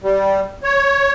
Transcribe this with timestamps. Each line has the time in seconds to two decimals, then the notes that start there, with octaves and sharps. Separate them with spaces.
0.03 G3
0.63 C#5